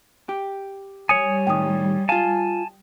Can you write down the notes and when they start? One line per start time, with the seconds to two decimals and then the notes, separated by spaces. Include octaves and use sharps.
0.29 G4
1.09 G3 C#5 G#5 D#6 C#7
1.47 A2 D#3 G5 D#6
2.09 F4 F5 G#5 A5